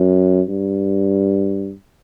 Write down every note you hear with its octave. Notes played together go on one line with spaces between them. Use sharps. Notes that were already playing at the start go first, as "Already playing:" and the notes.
Already playing: F#2
G2